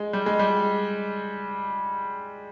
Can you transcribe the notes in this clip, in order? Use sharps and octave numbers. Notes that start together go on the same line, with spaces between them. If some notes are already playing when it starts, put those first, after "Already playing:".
Already playing: G#3
G3
G#3
G3